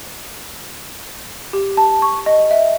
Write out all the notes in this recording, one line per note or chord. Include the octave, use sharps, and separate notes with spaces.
G4
A5
C#6
D#5
E5